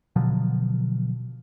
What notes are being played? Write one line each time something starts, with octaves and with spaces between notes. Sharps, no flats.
B2 D3 F3 F#3